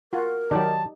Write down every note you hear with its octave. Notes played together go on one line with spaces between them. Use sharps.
F4 F#4 A#4
D#3 F#3 D#4 G4 D5 A5